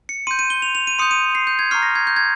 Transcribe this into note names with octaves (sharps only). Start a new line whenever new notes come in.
C#7
C6 G6 D#7
D#7
G7
F7
F7
D#7
C6 D#6 G6 C#7
D#7
C7
G6
G#6
A#5 C#6 F6 C7
A#6
G#6
G6
G#6